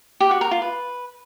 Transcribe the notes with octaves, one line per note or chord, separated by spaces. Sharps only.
G4
F#4
A#4
F4
B4